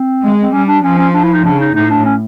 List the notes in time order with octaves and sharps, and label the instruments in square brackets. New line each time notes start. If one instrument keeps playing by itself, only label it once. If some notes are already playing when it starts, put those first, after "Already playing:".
Already playing: [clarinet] C4
[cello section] G#3
[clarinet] C4
[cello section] G3 [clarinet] C#4
[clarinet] D4
[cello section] F3 [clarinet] C#4
[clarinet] C#4
D4
E4
D#4
[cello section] C#3 [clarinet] D4
[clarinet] D#4
[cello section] A2 [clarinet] D#4
[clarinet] D4
C#4